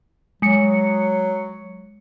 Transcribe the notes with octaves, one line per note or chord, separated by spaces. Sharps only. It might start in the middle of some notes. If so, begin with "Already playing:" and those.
F#3 G#3 C#7